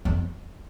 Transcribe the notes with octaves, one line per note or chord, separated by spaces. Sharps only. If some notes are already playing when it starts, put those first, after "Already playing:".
F2